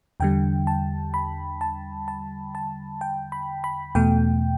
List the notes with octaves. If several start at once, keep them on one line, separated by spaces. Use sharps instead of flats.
E2 D3 G3 G5
A5
B5
A5
A5
A5
G5
B5
B5
E2 B2 A3 G5